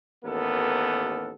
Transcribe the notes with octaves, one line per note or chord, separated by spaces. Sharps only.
A1 D#2 B3 A4 A#4